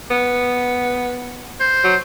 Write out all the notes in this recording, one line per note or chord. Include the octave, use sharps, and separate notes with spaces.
B3
C5
F#3